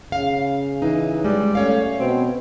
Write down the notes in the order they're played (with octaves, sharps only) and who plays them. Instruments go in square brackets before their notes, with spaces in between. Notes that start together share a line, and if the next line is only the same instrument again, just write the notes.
[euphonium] C#3 [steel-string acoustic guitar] F5
[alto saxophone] E3 [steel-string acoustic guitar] D#4
[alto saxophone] G3 [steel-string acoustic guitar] G#3
[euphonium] A3 [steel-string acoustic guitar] C#4 C#5 F5
[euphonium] B2 [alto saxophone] C4